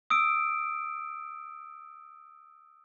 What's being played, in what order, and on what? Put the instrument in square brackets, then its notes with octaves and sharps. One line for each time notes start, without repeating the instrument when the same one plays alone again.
[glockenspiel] D#6 E6 D7